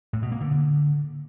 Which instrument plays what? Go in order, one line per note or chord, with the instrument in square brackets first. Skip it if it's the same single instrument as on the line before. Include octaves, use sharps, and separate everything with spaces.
[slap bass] A2
B2
A#3
D3